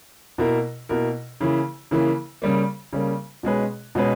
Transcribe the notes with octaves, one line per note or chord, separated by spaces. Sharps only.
B2 A#3 E4 A#4
B2 A#3 E4 A#4
C#3 E3 A#3 E4
C#3 E3 A#3 E4
C#3 G3 A#3
C#3 G3 A#3
B2 G#3 C#4 G#4 B4
B2 G#3 C#4 G#4 B4